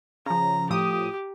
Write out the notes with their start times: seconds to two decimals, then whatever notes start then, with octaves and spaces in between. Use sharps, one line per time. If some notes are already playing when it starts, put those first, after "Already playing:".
0.26 C#3 F3 A#5
0.70 A2 F3 G4 D#6